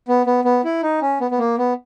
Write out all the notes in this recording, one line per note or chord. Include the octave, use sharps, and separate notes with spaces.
B3
B3
B3
E4
D#4
C#4
B3
B3
A#3
B3